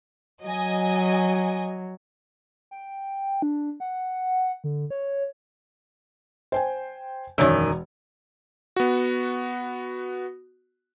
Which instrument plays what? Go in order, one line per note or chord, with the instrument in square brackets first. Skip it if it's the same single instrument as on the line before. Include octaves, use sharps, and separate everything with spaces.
[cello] F#3 [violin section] D#5 G#5
[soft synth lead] G5
D4
F#5
D3
C#5
[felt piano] C5 G5 G#5
[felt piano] E1 C#5 D5 [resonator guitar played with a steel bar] F#2 D#3
[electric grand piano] B3 F#4